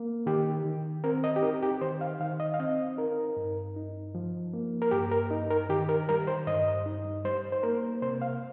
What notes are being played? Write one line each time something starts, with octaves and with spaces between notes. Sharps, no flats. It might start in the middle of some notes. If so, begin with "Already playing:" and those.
Already playing: A#3
D#3 G4
D#3
C4 A#4
D#5
G4
D#4 A#4
G4
D#3 C5
F5
D#3 F5
D#5
F5
C4 D#5
D#4 A#4
G2
D#4
F3
A#3
A#4
G2 G4
A#4
D#4
A#4
D#3 G4
A#4
G3 A#4
C5
G2 D#5
D#4
G3 C5
C5
A#3 A#4
C3 C5
F5